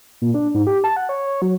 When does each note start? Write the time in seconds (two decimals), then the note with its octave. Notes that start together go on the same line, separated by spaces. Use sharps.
0.22 A#2
0.34 D4
0.54 G#2
0.67 G4
0.84 A5
0.97 F#5
1.09 C#5
1.27 C#5
1.42 F#3